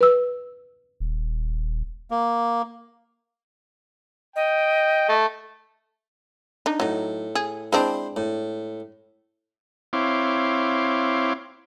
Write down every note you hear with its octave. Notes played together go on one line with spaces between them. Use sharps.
B4 E6
D#1
A#3
D#5 G5
A3
D4 D#4
A2 F#3 D#4
G#4
G#3 C4 D4 E4 C5
A2
C4 E4 C#5 F5 C6 D6